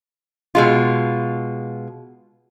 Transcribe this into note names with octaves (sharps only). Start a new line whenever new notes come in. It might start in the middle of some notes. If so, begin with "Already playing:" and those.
B2 G#3 F4